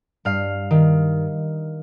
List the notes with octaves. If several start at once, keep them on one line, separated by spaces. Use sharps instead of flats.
G2 F5
D#3